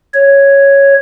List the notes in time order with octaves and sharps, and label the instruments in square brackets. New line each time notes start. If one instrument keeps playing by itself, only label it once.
[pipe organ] C#5